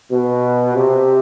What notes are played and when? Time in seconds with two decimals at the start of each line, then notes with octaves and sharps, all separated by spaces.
0.12 B2
0.75 C3